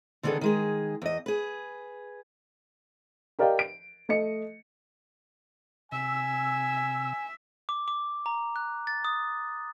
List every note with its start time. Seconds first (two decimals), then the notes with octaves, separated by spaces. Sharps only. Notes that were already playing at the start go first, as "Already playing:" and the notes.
0.23 D3 D#3 B3 D4 G#4 A4
0.41 D#3 G#3 G#4
1.02 E2 D#5
1.26 G#4 B4
3.39 G4 A#4 D5 D#5 F5 G5
3.59 D7
4.09 A3 D#5 C#7
5.92 C3 E5 G#5 E6
7.69 D6
7.88 D6
8.26 A#5
8.56 F#6
8.87 A6
9.05 D#6